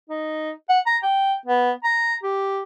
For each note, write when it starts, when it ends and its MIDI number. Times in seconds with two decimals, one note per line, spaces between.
0.09 0.51 63
0.69 0.79 78
0.86 0.97 82
1.03 1.34 79
1.46 1.71 59
1.84 2.15 82
2.23 2.63 67